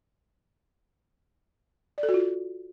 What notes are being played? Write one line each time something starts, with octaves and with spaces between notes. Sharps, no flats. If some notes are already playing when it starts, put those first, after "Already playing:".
D5
A4
F#4
F4